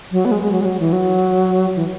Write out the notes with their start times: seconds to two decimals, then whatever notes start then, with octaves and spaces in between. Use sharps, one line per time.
0.12 F#3
0.25 B3
0.32 G#3
0.43 G#3
0.52 F#3
0.61 G#3
0.65 F#3
0.80 E3
0.93 F#3
1.76 E3